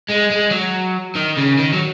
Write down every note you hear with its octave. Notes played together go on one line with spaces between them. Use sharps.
G#3
G#3
F#3
D#3
C#3
D#3
F#3